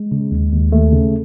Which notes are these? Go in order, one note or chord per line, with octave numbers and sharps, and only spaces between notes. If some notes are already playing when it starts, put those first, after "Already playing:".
Already playing: G#3
C#3
D#2
D#2
D#2 A3
C#3